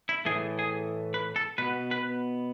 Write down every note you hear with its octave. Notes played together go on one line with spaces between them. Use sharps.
E4
A2 E3 A3 G#4
G#4
B4
A4
B2 B3 B4
B4